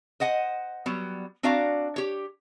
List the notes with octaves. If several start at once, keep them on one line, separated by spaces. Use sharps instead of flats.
C5 D#5 F#5 G#5
F#3 G3 B3
C4 D4 F#4 D5 F5 A#5
G4 C#5